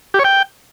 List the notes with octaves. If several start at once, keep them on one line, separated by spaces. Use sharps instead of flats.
G4
C#5
G5